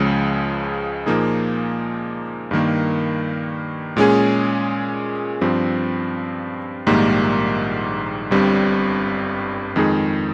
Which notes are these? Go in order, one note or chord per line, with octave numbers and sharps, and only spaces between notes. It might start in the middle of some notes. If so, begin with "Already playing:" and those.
Already playing: C#2 C#3 F3 G#3 C#4
A#2 F3 A#3 D#4 G#4
G2 D#3 A#3
A#2 G#3 C#4 G#4
G2 F3 C4
A#1 G#2 D#3 G3 A#3
G1 G2 G3 C4
F2 D#3 G#3 D#4 G#4